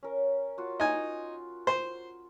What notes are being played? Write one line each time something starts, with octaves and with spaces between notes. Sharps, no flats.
C#4 A#4
F4 F#4
D#4 G#5
C5